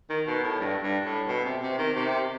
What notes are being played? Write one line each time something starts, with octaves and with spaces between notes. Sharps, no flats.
D#3
B2
A2
G2
G2
A2
B2
C3
C3
D#3
C3